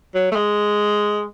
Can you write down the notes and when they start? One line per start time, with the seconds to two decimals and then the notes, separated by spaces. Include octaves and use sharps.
0.15 F#3
0.32 A3
0.36 G#3